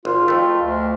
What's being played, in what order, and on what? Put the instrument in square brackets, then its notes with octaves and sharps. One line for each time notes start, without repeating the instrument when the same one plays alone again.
[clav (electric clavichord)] G#1 [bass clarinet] F4
[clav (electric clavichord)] F2 A3
[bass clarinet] D2